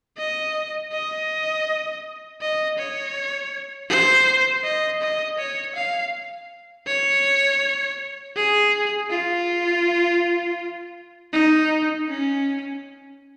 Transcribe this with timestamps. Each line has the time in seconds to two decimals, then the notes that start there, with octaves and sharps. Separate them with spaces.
0.18 D#5
0.92 D#5
2.42 D#5
2.78 C#5
3.89 C5
4.64 D#5
5.02 D#5
5.38 C#5
5.75 F5
6.87 C#5
8.36 G#4
9.10 F4
11.33 D#4
12.08 C#4